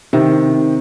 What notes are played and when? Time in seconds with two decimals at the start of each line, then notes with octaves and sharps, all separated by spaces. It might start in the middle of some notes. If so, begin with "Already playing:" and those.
0.13 C3 D#3